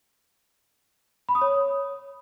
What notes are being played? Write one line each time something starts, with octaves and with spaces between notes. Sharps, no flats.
B5
D#6
C#5